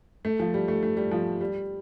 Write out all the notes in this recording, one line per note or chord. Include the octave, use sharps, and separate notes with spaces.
A3
F3
G3
A3
A3
G3
F3
G3